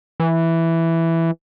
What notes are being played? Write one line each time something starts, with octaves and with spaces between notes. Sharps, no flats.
E3